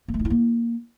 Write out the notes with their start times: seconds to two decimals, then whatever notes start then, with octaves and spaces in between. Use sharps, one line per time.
0.08 A#3
0.14 A3
0.19 D#4
0.25 E4
0.30 A#3